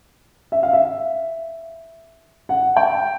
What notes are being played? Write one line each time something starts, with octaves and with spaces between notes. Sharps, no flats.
E5
F5
E5
F#5
G5